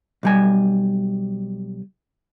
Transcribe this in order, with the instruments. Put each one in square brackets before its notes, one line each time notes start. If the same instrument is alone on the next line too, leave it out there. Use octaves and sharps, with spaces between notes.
[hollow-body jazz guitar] B1 G3 G#5